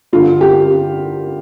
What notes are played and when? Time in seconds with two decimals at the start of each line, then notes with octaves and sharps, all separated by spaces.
0.13 G2 D3 F4
0.41 G4